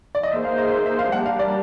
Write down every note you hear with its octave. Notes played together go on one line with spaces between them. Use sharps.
D5
D#5
A#3 D#4 G#4 C5 E5
F5
D#5
E5
E5
F5
G3 A#3 D4 G4 F#5
F5
D5